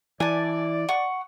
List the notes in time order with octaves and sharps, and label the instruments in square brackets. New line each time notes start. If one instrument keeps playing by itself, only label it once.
[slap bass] E3 [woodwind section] D5 [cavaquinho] G#5 A5
[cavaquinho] F#5 C#6